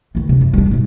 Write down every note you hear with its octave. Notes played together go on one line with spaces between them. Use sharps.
D2 D#3
C3 D4
F#2
G3 D4
G#2 B2